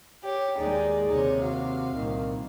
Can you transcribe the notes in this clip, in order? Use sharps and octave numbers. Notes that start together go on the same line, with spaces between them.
G4 C#5
D#2 G#3 D#4 G#4 D5
D#2 C3 D#4 C#5
F#4 F5
C2 A#2 D#3